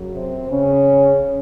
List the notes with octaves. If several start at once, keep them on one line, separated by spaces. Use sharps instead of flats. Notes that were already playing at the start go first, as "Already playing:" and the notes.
Already playing: F#2 C#3 F#3
C3 C4
C#3 C#4